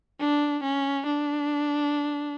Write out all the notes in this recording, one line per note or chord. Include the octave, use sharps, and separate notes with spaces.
D4
C#4
D4